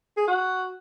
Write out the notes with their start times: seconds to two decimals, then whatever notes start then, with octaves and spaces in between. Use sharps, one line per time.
0.17 G#4
0.28 F#4